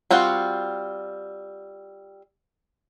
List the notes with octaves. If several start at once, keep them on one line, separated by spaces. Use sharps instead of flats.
G3 C4 F4 F#4 F#5